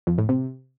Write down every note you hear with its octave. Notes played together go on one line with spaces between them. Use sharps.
F2
A2
C3